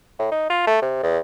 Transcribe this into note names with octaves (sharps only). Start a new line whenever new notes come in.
A2
D#4
F4
A3
C3
E2